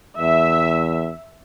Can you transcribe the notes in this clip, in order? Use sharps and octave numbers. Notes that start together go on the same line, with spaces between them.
E2 E5